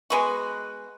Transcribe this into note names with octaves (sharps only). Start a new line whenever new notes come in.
G#3 B3 F#4